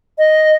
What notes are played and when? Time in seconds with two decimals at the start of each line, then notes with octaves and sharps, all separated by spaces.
0.18 D#5